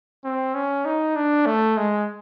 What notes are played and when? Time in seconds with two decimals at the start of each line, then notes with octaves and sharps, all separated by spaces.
0.24 C4
0.55 C#4
0.85 D#4
1.16 D4
1.46 A3
1.77 G#3